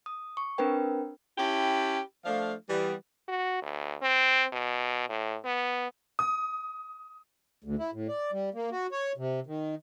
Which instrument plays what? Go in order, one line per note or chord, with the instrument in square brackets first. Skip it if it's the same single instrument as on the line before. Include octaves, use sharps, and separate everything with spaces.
[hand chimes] D#6
C#6
C4 D4 A#4 B4 G5
[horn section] C#4 E4 G4 G5 A5 B5
F3 A3 D4 F5
E3 G3 B3
[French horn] F#4
D2
C4
B2
A2
B3
[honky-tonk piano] D#6
[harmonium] D2
E4
A2
D5
G3
A#3
F#4
C#5
C3
D#3